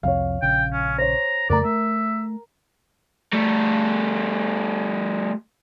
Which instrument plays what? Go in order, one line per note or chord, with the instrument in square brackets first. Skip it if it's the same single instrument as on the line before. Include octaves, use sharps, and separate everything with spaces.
[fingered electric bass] C2 F2 C3 [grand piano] C#5 F5
[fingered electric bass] A#1 C#3 [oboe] G5
[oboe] C#4
[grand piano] C5 C#5 [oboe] A#5
[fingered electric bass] F2 C#3 A3 [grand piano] A#4 A#5 [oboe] D5
[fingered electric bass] A3 [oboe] E5
[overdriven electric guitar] G3 A3